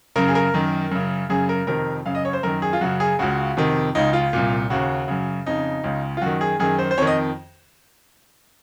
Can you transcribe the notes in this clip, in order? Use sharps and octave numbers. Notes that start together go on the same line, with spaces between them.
F#2 C#3 A#4
G#4
A#4
F#2 D#3
F#2 C#3
F#2 C#3 G#4
A#4
F2 C3 D#3 A#4
F#2 C#3 F5
D#5
C#5
C5
F#2 D#3 A#4
G#4
F4
F#2 C#3 F#4
G#4
C#2 C#3 F#4
F2 C3 D#3
C#2 C#3 D#4
F4
C2 A#2
D#2 C#3 F#4
F#2 C#3
F2 C#3 D#4
C#2 C#3
F4
F#2 D#3 F#4
G#4
F#2 D#3 G#4
C5
C5
F2 D#3 C#5
D#5